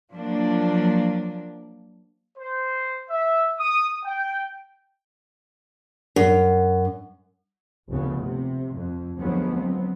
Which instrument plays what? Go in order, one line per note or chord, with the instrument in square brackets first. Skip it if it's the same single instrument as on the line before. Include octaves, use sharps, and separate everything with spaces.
[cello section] F3 F#3 A#3 D4
[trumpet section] C5
E5
D#6
G5
[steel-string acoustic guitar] F#2
[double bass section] F1 D2 C#3 B3
C3
F2
D2 F3 F#3 G#3 B3 C#4
F#3 B3 C4